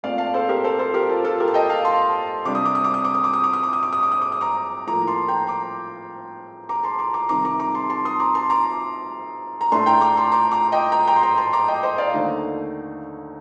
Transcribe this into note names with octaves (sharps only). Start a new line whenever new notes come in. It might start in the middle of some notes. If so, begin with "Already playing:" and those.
A#2 A3 C4 D5 F5
F5 A5
A4 C5
G4 A#4
A4 C5
A4 C5
G4 A#4
F4 A4
F4 A4
G4 A#4
A5
D#5 G5
F5 A5
A5 C6
C3 G3 D4 D6
D#6
D6
D#6
D6
D#6
D6
D#6
D6
D#6
D6
D#6
D6
D#6
D6
D#6
D6
D#6
D6
D#6
A#5 D6
A2 F3 A#3 A#5 D6
A5 C6
G5 A#5
A#5 D6
A#5 D6
A5 C6
A#5 D6
A#5 D6
C3 D#3 G3 A#5 D6
A#5 D6
A#5 D6
A5 C6
A5 C6
C6 D#6
A#5 D6
A5 C6
A#5 D6
A#5
A2 A3 D4 A5 C6
G5 A#5
A#5 D6
A5 C6
A#5 D6
A#5 D6
D#5 G5
G5 A#5
G5 A#5
C6
G5 A#5
A5 C6
A#5 D6
D#5 G5
C5 D#5
D5 F5
D#2 D3 A3 D#4